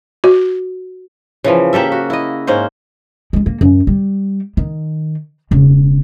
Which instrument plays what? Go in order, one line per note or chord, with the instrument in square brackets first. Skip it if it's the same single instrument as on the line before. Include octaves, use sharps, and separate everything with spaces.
[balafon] F#4
[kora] C#3 E3 F3
A#3 G4 A4 E5
F#4
E4 D#5
G#2 A#3 C#4 C5
[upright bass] F3 G#3
A#3
F#2
G3
D#3
E1 C#3